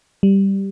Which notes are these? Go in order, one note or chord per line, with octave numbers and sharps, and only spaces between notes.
G3